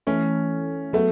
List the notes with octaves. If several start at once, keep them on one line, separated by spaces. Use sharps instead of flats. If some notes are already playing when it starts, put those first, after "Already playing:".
E3 A3 C#4 E4 A4
F#3 A3 B3 F#4